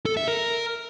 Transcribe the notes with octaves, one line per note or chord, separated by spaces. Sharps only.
A4
E5
A#4